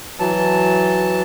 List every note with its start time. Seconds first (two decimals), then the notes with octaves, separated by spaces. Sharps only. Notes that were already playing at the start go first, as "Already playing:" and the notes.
0.20 E3 F#3 A5